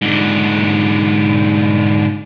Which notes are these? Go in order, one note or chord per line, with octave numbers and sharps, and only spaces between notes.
G#2 D3